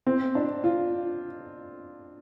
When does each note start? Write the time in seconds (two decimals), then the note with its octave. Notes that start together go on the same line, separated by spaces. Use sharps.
0.07 C4
0.35 D4
0.64 F4